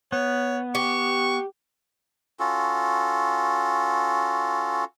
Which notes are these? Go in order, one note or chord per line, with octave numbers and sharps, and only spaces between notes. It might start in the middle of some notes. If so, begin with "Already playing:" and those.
B3 C#5
G4 C#6
C#4 F4 F#4 A4